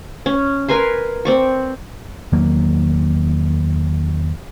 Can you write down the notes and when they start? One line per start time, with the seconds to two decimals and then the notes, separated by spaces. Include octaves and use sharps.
0.26 C#4
0.69 A#4 B4 G#5 C6
1.25 C4 D5 C#6
2.32 E2 D#3 F#3 A#3